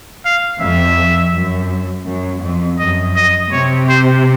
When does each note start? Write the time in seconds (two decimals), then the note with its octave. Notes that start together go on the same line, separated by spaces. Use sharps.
0.25 F5
0.60 F2 E5
1.33 F#2
2.06 F#2
2.42 F2
2.79 F#2 D#5
3.16 D#5
3.52 C3 C#5
3.89 C5